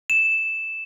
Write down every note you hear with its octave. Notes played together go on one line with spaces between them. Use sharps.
E7